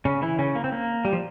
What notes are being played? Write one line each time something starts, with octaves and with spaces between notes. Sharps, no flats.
C#3 C#4
E3 E4
C#3 C#4
A#3
C4
A#3
G3
F3